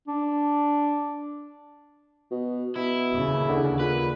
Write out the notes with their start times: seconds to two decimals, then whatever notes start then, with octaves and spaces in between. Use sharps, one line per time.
0.07 D4
2.31 B2
2.76 B2 E4
3.11 D#2 C#3
3.48 D3
3.79 A#2 B4